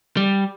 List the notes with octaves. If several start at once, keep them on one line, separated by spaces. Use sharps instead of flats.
G3